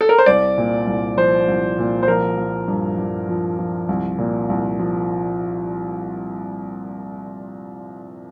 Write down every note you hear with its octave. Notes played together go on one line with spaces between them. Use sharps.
A4
A#4
C5
C2 D5
A#2
C2
F3 C5
C2
A#2
C5
F3 A#4
F3
G2
G2
F3
F3
C2
A#2
C2
F3